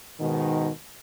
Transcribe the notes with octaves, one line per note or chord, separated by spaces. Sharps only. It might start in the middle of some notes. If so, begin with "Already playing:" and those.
G#2 B2 D#3